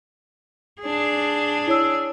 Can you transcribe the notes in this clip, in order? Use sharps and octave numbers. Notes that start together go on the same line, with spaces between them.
D4 G#4
E4 C#5 E6